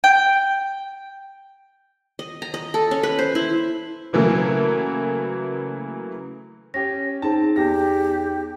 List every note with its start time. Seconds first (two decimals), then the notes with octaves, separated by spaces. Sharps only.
0.04 G5
2.19 D#5
2.42 A#5
2.54 D#5
2.74 A4
2.91 C#4
3.03 B4
3.19 C5
3.35 E4
4.13 C#3 E3 F#3 A3 A#3
6.74 C#4 G4 A#6
7.22 C4 D#4 G#4 A5
7.56 E2 G4 A#6